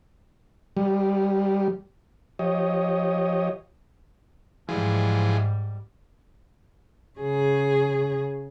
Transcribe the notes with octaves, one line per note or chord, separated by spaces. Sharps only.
G3
F3 G4 C#5 D#5
G#2 E3 F3 G3 G#3
C#3 G#4